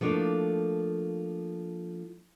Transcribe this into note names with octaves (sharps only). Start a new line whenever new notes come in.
F3 A3 A#3 D4